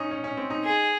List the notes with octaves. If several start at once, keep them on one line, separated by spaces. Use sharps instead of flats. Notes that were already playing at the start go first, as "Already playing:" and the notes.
Already playing: C#4 D#4
C#4
C#4
C4
D#4
G#4